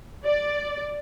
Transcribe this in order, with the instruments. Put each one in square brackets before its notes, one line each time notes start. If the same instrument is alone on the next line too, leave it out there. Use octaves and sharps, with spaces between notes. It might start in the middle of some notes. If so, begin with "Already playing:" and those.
[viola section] D5